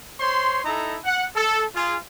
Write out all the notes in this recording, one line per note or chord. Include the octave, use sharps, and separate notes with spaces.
C5 C#5 C6
D#4 E4 A4 A#5
F#5
A4
F4 G#4